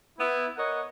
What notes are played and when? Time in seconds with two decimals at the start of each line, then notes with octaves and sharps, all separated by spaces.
0.19 B3 E4
0.56 A#4 C#5 D#5 F#5